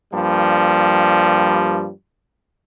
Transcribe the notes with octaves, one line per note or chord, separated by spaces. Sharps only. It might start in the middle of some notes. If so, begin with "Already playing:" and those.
G2 F3 G3 A#3